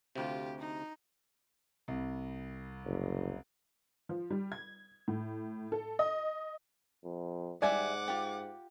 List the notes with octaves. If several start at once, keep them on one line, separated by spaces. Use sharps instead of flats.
D2 C3 F4 G4
D#4
C2
F#1
F3
G3
G#6
A2
A4
D#5
F2
G#2 G3 G#3 D5 E5 F#5 G#5 D6
F4 G4